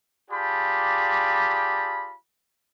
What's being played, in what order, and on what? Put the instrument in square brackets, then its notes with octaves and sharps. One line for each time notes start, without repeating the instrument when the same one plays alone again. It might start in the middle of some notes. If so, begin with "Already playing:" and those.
[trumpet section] F4 G4 G#4 D5 A5 B5